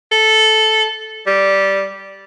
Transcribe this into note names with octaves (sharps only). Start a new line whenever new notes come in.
A4
G3